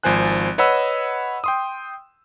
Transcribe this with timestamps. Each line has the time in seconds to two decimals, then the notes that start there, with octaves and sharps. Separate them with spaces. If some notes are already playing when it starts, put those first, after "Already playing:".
0.03 G#1 F3 C5 G#5 F#6
0.58 B4 C#5 D#5 F#5 B5 E6
1.44 G5 C6 D#6